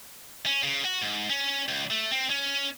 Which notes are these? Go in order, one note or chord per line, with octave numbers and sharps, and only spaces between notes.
C#4
C#3
F#4
G#2
C#4
C#2
A3
C4
C#4